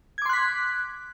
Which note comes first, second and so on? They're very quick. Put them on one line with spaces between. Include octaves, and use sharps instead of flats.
G#6 D6 C6 F#6 B6